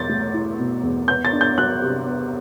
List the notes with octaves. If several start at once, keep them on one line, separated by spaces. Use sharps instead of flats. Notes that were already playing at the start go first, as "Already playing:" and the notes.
Already playing: E2 B2 G6 A6
A3
E4
B2
E2
B3 G6
A6
D4
G6
F#3 F#6
C3
B3